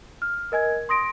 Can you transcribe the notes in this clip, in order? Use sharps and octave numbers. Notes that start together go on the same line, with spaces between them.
F6
A#4 D#5 G#5 G#6
C6 D#6 A#6 D7